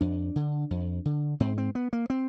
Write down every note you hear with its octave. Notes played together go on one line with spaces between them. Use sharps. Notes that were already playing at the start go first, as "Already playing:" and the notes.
F2 D4
D3
F2
D3
G#2 C4
C4
B3
A#3
C4